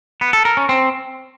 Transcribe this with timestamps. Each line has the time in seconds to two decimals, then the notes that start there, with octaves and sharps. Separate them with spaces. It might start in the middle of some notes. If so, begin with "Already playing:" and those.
0.21 B3
0.33 A4
0.45 A#4
0.57 C#4
0.69 C4